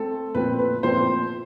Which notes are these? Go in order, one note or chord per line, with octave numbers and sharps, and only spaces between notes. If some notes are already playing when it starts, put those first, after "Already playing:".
Already playing: A3 C4 A4
A#2 F3 A3 C4 B4
B4
A#2 F3 A3 C4 C5